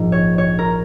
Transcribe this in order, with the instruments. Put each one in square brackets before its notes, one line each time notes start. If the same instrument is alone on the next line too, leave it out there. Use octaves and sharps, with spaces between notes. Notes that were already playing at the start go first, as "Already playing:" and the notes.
Already playing: [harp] A#1 G#2 F3
C#5
C#5
A#4